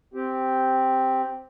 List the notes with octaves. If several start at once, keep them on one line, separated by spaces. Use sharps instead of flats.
C4 G4